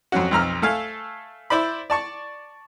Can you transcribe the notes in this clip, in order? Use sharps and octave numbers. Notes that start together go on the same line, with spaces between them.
F2 F#3 C#4 F#4
B1 F2 A#5 F6
A3 A4 F5 G#5
E4 C5 D5 B5
D5 A5 C#6